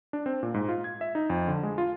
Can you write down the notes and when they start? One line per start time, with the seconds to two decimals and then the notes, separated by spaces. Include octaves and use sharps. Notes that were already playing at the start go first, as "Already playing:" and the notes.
0.13 D4
0.26 C4
0.43 A#2
0.54 G#2
0.69 F4
0.84 G#6
1.01 E5
1.15 D#4
1.30 F2
1.48 D3
1.63 G#3
1.78 F4